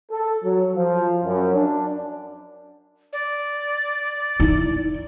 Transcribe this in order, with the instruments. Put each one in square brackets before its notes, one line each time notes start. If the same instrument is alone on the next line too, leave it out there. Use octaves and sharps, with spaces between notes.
[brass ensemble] A4
F#3
F3
F#2
D4
[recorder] D5
[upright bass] D#4 E4